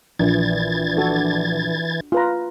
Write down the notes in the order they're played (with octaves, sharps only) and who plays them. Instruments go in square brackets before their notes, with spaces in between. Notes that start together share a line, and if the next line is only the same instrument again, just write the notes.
[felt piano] A#1 [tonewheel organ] E3 G#6 A6
[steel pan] D4 F#4 A4
F4 B4 A#5